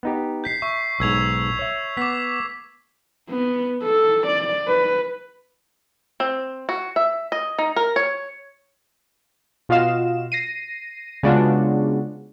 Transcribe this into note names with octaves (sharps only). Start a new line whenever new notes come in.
B3 D#4 G4
G6 B6 C7
E5 C#6
B1 G#2 E6 G#6 F7
C#5 E5
B3 D6 B6
B3
A4
D5
B4
C4
F#4
E5
D#5
D#4
A#4
C#5
B2 F4 F#4 D#5 F5 E7
A#6 C7 D#7
C#3 G#3 B3 D4 F4 F#4